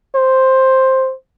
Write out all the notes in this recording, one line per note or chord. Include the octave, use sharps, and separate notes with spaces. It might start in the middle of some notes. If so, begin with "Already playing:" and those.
C5